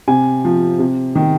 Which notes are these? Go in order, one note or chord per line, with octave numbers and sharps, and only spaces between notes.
C3 G#5
F3
C3
D#3